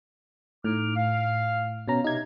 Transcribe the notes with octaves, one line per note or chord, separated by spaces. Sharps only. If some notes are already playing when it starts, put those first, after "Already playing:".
A2 D#4 D6 F6
F5
B2 C#4 A#5
C3 D#4 G#6